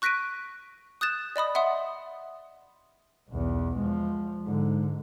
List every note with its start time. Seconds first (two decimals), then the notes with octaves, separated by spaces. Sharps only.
0.02 C#6 F#6 A#6 B6 D7 D#7
1.01 D#6 F#6 G6 A6 E7
1.36 D5 D#5 B5 D#6
1.55 E5 F#5 C6 D#6
3.30 B1 E2
3.77 F3 G#3
4.45 G#2 D3